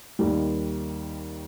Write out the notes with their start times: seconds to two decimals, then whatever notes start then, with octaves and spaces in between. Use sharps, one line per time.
0.19 D#2 D#3 G3